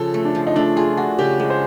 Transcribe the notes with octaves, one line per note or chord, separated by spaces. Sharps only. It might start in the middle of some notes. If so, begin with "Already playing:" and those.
Already playing: C#3 F3 A4
A3
D4
F3
D#4
A3 D4
F4 G#4
D4 F#4
C#3 G4
G#3 G4
C5